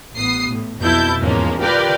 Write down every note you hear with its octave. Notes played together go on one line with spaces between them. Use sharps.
A1 B3 D#6 C7
A2
B1 F2 B2 E4 A5 G6
E2 G#2 F3 G#3 A#3 C#4
F4 G4 A#4 B4 D5 G5